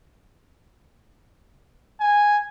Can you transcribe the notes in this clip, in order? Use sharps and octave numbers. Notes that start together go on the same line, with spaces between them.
G#5